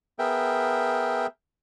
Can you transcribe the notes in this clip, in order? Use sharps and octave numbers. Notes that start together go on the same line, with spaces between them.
B3 G#4 A#4 E5 G5